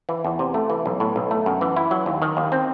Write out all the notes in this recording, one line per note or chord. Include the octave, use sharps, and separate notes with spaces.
E3
E2
C3
A3
E3
B1
A2
B1
A3
F#2
E3
E4
F#3
D#2
D#3
D#2
C4